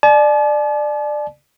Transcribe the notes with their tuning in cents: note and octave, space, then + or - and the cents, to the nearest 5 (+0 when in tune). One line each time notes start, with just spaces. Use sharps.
D5 +20 A5 -45